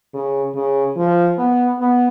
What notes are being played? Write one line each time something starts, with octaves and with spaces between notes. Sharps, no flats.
C#3
C#3
F3
B3
B3